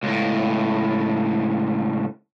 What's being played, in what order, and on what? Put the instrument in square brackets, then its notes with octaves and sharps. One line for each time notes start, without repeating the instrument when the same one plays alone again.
[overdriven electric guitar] C#2 A2